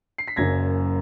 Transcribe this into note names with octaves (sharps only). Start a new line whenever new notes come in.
C7
B6
F#1 F#2 C#3 G#6 A#6